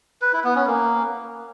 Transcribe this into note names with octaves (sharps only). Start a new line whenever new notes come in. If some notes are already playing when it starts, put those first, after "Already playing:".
B4
E4
B3
C#4
A#3